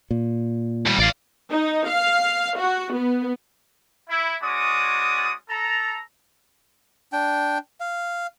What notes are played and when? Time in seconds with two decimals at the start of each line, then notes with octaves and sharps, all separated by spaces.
0.11 A#2
0.86 D#2 G3
0.99 A1 D5 F5
1.50 D#4
1.88 F5
2.60 F#4
2.93 B3
4.08 E4
4.41 G#3 C#4 F#4 D5 D#6
5.49 A4 A#5
7.13 D4 G5
7.80 F5